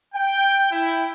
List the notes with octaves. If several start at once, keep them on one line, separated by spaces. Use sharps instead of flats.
G5
E4